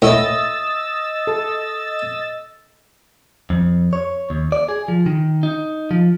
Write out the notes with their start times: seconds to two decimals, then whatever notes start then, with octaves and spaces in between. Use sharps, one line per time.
0.02 A2 E4 D#5 E6 A6
1.27 A4
3.50 F2
3.93 C#5
4.30 D#2
4.52 D5
4.69 G#4
4.88 F3
5.06 D#3
5.43 D#4
5.91 F3